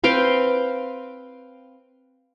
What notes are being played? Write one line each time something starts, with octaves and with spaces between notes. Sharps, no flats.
C4 B4 F5 G5